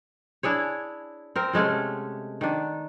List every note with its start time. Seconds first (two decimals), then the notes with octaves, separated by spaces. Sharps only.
0.43 D4 E4 G#4 C#5
1.36 C4 A#4
1.53 C3 G#3 A3 C#4
2.41 D#3 D4